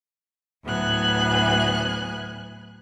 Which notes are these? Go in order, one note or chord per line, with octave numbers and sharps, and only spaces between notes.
D2 A2 F#3 B3 G#5 F#6